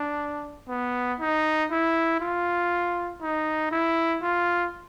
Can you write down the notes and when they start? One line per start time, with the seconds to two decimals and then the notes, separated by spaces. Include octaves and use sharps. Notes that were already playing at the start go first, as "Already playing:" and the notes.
Already playing: D4
0.68 B3
1.20 D#4
1.70 E4
2.21 F4
3.21 D#4
3.71 E4
4.22 F4